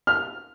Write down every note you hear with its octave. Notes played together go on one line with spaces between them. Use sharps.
F6